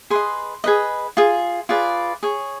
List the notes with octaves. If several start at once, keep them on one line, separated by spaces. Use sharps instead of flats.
G#4 B4 D#5 C6
G#4 B4 D#5
F4 G#4
F4 G#4 B4 D5
G#4 C#5